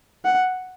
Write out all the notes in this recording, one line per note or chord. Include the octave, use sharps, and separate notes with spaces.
F#5